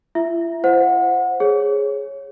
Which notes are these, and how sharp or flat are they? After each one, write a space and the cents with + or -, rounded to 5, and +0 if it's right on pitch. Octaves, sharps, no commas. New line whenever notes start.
E4 +45 E5 +0
C5 +0 F#5 -20
G#4 +0 C#5 -10